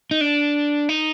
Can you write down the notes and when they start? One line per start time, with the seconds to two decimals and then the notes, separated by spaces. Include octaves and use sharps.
0.11 D#4
0.21 D4
0.89 D#4